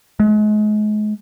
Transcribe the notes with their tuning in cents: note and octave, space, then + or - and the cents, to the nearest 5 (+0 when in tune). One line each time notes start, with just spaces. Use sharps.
G#3 +35